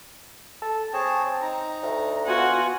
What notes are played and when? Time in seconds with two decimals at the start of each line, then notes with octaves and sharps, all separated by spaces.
0.62 A4
0.93 C4 G#4 C#5 A5
1.42 D#4 A#5
1.83 D2
2.27 B3 F4 F#4 G#5